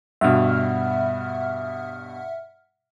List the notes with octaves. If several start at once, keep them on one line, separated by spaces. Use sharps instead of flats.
G2 B2 E5 F#5 F6